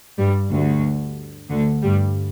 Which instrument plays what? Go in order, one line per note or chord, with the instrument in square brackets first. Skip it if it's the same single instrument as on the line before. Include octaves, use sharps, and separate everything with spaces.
[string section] G2 G3
D2 D3
D2 D3
G2 G3